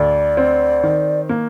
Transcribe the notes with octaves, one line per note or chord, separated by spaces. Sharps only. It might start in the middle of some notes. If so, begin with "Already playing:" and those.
Already playing: D2 D5
C4
D#3
A#3